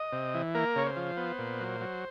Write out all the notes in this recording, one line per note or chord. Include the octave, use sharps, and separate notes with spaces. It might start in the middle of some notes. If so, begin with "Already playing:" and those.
Already playing: D#5
C3
E3
A#3 A#4
C#3 C#5
C5
F3
B3
A#2
F#3
F#3